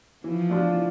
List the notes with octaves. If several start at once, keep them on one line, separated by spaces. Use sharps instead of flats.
E3 F3
A3 D4 F4
E3